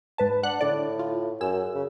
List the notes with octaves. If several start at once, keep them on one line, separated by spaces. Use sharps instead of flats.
G#2 B4 A5
D4 F#5 F#6
A2 D3 D5
F4
F#2 G#4 E6
C#3